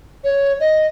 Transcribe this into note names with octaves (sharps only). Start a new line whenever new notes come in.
C#5
D#5